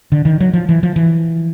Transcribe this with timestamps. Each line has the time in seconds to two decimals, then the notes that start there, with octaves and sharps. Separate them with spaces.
0.12 D3
0.25 D#3
0.41 F#3
0.54 F3
0.69 E3
0.83 F3
0.96 E3